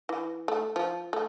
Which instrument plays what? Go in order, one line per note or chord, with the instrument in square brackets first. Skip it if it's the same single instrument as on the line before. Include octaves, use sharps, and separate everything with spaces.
[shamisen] E3
A3
F3
A3